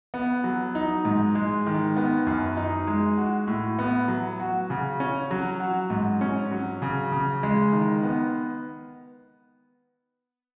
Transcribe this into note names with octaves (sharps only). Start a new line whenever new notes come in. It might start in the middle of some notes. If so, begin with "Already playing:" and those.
B3
F#3
D#4
G#2
G#3
D#3
B3
F#2
D#4
G#3
F#4
A2
B3
F#3
F#4
C#3
C#4
F#3
F#4
G#2
C#4
F#3
C#3
C#3
G#3
D#3
B3